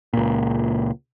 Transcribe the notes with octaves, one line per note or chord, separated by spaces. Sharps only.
C#2 A#2